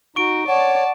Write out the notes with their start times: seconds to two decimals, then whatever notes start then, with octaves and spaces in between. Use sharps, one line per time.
0.16 D#4 F#4 C#6 D7
0.48 C#5 D5 F#5 A5